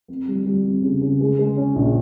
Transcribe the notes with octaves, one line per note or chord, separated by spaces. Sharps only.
F2
G3
G3
F2
C#3
C#3
G#3
G#3
C#4
A#1